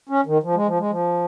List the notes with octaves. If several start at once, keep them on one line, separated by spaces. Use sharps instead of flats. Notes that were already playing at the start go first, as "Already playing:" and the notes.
C#4
D#3
F3
G#3
F3
G#3
F3